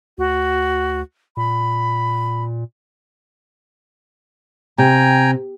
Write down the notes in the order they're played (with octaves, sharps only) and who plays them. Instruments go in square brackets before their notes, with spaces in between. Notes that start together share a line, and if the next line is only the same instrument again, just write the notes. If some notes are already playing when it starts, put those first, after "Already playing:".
[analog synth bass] D2 [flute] F#4
[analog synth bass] A#2 [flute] B5
[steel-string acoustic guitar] C3 [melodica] G5 G#5 A#5